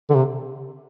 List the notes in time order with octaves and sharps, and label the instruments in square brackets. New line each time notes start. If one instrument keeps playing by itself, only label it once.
[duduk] D3
C3